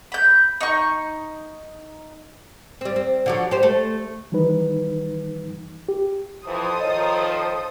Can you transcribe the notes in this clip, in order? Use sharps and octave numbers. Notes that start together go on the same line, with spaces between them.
B5 G6
D#4 C#6
G3 C4
C4
D3 F3 F#3
G4 C5
A3
D#3 E3 G3 D#4 B4
G4
F2 E3 A4 C5 D#6
D#3 F3 C#5 D#5